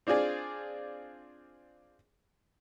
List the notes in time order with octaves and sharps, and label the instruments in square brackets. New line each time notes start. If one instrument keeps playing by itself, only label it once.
[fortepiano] C4 D4 F4 G#4 D5